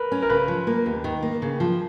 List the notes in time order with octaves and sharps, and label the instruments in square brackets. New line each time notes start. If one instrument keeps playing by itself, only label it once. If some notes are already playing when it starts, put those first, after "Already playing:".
Already playing: [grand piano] A#4 B4
[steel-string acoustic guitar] C#4
[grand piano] A#4
[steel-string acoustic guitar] C#3 [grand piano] B4
[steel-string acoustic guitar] F3
A#3
D#2
D#3
A#3
C#3
F3